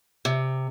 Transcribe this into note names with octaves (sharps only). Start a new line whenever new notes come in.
C3